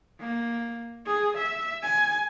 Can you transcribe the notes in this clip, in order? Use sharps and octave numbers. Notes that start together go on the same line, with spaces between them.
A#3
G#4
E5
G#5